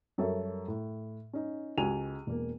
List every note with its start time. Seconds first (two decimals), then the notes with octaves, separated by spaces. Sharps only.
0.18 F#2 G3 A4 A#4 C#5 E5
0.68 A2
1.33 C#4 D#4
1.77 C#2 F#4 G4 G#5 D#7 F7
2.27 E1 A#3